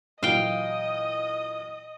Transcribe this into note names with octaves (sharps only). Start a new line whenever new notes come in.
A#2 E3 F#3 D#5 F5 G5